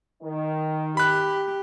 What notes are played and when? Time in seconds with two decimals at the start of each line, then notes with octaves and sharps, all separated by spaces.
0.23 D#3
0.97 G4 B5 F#6